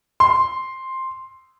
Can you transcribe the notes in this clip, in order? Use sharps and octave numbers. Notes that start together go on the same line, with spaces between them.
C6